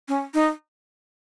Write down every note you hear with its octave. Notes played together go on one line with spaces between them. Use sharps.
C#4
D#4